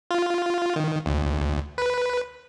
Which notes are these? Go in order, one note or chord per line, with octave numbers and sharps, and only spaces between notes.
F4
D#3
D2
B4